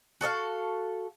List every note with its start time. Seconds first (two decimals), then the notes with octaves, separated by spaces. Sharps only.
0.21 F#4 A4 D#5 F5